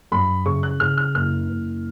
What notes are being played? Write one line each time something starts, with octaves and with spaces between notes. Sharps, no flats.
F#2 B5
C#3 C#6
F#6
C#3 F6
F6
F#1 F6
F#1